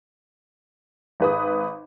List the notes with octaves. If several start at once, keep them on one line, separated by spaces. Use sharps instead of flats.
G#1 B4 D#6